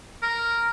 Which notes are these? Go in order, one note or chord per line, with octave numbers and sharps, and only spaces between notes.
A#4